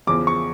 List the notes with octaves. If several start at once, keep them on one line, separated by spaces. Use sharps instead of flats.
E2 C#3 F3 D6
C#6